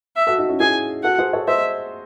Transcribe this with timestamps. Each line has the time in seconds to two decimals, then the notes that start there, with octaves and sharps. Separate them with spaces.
0.16 E5
0.27 F#4 A4
0.38 D#4 F#4
0.49 C#4 E4
0.60 E4 G#4 G#5
1.04 F#4 A4 F#5
1.18 G#4 C5
1.33 A4 C#5
1.48 C5 D#5 E5